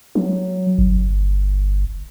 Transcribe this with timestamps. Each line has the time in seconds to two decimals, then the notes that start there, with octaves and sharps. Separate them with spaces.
0.15 F#3
0.78 G1